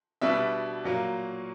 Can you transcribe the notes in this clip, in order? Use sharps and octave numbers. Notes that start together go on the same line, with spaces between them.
B2 G3 B3 D4 E5
A#2 F#3 A#3